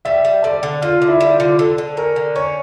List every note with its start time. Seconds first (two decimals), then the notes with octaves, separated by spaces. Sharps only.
0.05 G3 E5
0.25 G3
0.44 D3 D5
0.63 D3
0.82 D3 F4
1.02 D3
1.08 E4
1.21 G3
1.34 F4
1.40 D3
1.59 D3 A4
1.78 D3
1.97 C#4 A#4
2.16 D3
2.36 C#4 C#5